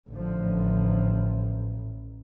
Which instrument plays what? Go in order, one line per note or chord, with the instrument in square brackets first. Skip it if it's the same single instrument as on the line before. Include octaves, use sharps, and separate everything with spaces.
[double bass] A1 [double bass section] D3 F3